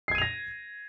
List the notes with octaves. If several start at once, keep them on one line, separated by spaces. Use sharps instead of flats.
G#6 A#6 C7 D#7 F7